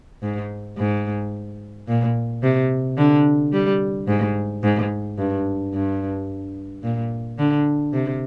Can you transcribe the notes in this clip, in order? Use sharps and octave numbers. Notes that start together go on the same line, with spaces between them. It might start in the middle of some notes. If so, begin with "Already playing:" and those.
G#2
G#2
A#2
C3
D3
G3
G#2
G#2
G2
G2
A#2
D3
C3